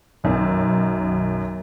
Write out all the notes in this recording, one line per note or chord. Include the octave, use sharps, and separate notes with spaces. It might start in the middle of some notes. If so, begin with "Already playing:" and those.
B1 F#2 D#3